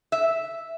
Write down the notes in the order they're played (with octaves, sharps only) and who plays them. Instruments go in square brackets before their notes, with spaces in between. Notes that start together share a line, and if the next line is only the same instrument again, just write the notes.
[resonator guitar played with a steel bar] E5